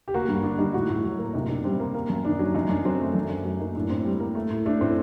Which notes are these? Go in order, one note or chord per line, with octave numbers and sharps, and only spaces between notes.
G4
A#3 F#4
G2
D3 D4
G3 D#4
A2 F#4
A2
F#3
A#3
C3 D#4
C3 D4
G3 C4
A#3
A#3
F#2
D#3 D4
F#3
F#2 D#4
F#2 D4
F#3 C4
A3
F#2 D4
F#2
F#3
A#3 D#4
A2 D4
A2 C4
G3
A#3
A3
A2
A3 D4
A2 C4